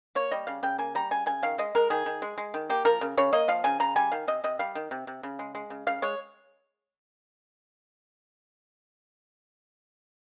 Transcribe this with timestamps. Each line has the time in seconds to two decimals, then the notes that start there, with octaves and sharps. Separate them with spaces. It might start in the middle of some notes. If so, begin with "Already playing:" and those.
0.15 A#3 C#5
0.31 G3 D#5
0.47 C#3 F5
0.63 C#3 G5
0.78 A#3 G#5
0.95 G3 A#5
1.11 C#3 G#5
1.26 C#3 G#5
1.43 D#3 F5
1.58 G#3 D#5
1.75 G#3 A#4
1.90 D#3 G#4
2.06 D#3
2.22 G#3
2.38 G#3
2.54 D#3
2.70 A#3 G4
2.85 F3 A#4
3.01 C#3
3.17 C#3 C#5
3.33 A#3 D#5
3.48 F3 F5
3.64 C#3 G#5
3.80 C#3 A#5
3.96 G3 G#5
4.12 D#3 F5
4.28 C3 D#5
4.44 C3 D#5
4.59 G3 F5
4.75 D#3
4.91 C3
5.07 C3
5.23 C#3
5.39 G#3
5.55 G#3
5.70 C#3
5.87 C#3 F5
6.02 G#3 C#5